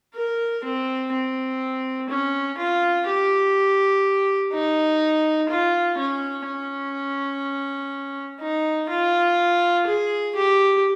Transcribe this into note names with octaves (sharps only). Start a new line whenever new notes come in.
A#4
C4
C4
C#4
F4
G4
D#4
F4
C#4
C#4
D#4
F4
G#4
G4